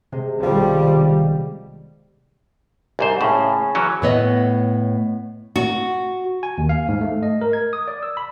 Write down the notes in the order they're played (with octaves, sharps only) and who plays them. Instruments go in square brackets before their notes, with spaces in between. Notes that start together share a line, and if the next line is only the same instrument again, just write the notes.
[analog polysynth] C3 [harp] G#3
[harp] B1 D#3 [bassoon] F3 [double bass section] G3
[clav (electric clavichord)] C2 G#2 C5
[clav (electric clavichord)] A2 [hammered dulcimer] C#3
[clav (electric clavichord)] E3 F#3 C#4
[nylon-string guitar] A2 A3 B3 C#5 D#5
F#4
[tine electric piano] G#5
D#2
F5
G#2
A3
D#5
A#4
G#6
D#6
D5
E6
B5